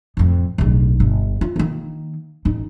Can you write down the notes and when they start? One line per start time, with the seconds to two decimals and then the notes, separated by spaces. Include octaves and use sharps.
0.17 F2 A2
0.58 D1 B1
1.00 G1
1.41 F4
1.56 D#3 A#3
2.45 A1 D#4